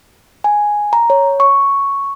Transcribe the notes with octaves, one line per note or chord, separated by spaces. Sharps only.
G#5
A#5
C#5
C#6